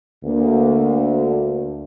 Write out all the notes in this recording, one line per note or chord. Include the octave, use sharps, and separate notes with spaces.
D2 A#3